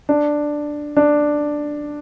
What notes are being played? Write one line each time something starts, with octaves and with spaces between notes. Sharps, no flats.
D4
D4